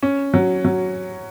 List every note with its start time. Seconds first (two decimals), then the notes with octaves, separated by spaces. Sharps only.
0.03 C#4
0.34 F#3
0.65 F#3